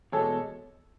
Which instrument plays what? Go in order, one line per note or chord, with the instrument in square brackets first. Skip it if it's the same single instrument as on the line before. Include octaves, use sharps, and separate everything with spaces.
[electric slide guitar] E2 B2 G#3 [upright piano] A4 C#5